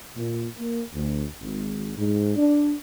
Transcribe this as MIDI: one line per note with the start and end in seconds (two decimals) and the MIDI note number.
0.17 0.45 46
0.56 0.81 58
0.94 1.26 38
1.40 1.92 32
1.97 2.31 44
2.36 2.74 62